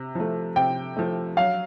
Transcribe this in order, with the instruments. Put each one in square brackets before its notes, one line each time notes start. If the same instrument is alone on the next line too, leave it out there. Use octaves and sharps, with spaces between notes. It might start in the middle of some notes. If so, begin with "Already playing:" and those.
Already playing: [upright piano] C3
F3 A3
[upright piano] C3 [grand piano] G5
[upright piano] F3 A3
[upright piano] F#3 [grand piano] F5